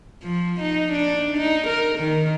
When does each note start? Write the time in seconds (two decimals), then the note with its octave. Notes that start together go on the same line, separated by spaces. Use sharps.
0.23 F3
0.60 D#4
0.92 D4
1.37 D#4
1.67 A#4
1.99 D#3